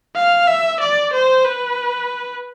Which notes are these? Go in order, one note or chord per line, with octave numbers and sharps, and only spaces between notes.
F5
E5
D5
C5
B4